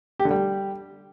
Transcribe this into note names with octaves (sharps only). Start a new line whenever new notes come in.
G4
D3
G3